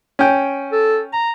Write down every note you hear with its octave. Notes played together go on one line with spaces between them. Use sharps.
C#4 G5
A4
A#5